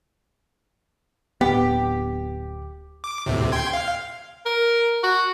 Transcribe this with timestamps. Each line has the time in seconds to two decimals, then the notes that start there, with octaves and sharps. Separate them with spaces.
1.41 D1 B3 G4
3.04 D6
3.26 D2 A2 C3
3.52 G5 C6 G#6
3.73 F5
4.45 A#4
5.03 F#4